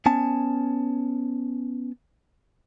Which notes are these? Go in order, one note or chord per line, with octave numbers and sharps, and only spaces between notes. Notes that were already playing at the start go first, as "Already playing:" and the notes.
B3 C#4 G#5 A5